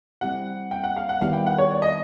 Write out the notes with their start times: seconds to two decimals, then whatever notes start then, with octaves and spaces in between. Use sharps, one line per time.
0.21 G3 C4 E4 G4 F#5
0.71 G5
0.84 F#5
0.96 F5
1.09 F#5
1.21 D#3 G3 B3 E4 G4 F5
1.33 G5
1.46 F#5
1.58 C#5
1.70 D5
1.82 D#5